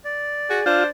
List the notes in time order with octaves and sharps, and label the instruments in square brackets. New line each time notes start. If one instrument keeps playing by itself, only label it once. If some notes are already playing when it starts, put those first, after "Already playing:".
[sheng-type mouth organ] D5
[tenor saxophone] F#4 [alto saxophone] G#4
[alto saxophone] D4 [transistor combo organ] F4 [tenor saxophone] C5